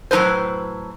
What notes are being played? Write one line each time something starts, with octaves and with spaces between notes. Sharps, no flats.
A2 F#3 D#4 B4 C5